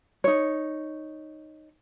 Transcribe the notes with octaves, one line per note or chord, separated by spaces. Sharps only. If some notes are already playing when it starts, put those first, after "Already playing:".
D#4 C#5